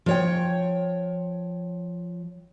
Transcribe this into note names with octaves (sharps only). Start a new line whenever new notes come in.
F3 C#5 G5